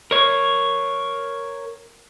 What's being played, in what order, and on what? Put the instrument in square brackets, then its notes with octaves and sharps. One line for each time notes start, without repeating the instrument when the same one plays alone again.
[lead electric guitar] A#4 C#5